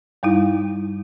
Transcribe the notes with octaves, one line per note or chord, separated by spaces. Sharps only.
G2 G3 D#4 E4